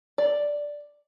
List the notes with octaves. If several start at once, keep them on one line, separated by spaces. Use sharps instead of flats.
D5